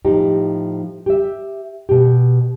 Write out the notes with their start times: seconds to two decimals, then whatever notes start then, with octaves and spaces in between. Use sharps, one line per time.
0.05 A2 F3 D#4 G4
1.06 G4 E5
1.89 B2 G4